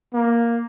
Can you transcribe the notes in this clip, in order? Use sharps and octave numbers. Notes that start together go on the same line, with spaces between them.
A#3